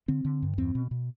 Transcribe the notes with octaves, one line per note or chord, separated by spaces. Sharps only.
D3 C4
D3
G2
E2 C4
B2
B2